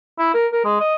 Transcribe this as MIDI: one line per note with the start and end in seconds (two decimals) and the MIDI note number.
0.18 0.30 64
0.34 0.47 70
0.52 0.60 70
0.65 0.77 56
0.80 0.96 75